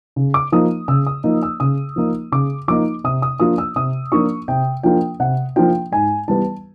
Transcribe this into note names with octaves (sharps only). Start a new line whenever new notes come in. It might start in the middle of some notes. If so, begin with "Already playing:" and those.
C#3
D6
F3 A#3 D#4 D#6
C#3 E6
D#6
F3 A#3 D#4
E6
C#3 D#6
F3 A#3 D#4
C#3 D6
F3 A#3 D#4 D6
C3 D#6
D#6
F3 A#3 D4 F4 D#6
E6
C3 D#6
F3 A#3 D4 F4 C#6
C3 G5
F3 A#3 D4 F4 G5
C3 F#5
F3 A#3 D4 F4 G5
G#2 G#5
E3 G3 B3 A5